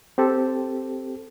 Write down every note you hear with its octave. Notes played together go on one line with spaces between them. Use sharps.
C4 G4 A4